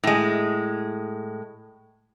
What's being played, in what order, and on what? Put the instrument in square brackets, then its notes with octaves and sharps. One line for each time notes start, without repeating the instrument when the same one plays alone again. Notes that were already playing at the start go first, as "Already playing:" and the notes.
[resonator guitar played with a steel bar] A2 G#3